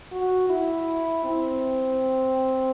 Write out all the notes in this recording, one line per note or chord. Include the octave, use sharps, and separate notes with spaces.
F#4
E4
C4